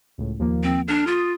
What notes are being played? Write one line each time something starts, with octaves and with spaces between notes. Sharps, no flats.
C#2 A2
D#2 F3 A#3
C4
D4 A4 F6
F4 D#6